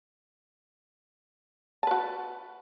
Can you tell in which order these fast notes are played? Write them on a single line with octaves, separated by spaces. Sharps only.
A5 B4 F#4